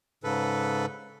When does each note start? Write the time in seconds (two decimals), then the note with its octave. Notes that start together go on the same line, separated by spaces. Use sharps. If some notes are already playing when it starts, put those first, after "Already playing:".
0.24 G#2 C#3 A4 B4